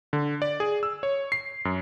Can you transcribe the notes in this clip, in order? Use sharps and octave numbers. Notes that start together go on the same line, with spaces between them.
D3
D5
G#4
E6
C#5
C7
F#2